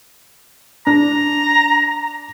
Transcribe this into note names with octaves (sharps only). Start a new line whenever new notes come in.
D4 A#5